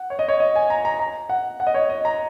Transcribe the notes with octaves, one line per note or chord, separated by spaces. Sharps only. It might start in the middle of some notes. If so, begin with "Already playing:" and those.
Already playing: F#5
C#5
D#5
C#5
D#5
G#5
A#5
A#5
A#5
F#5
F#5
D#5
C#5
D#5
A#5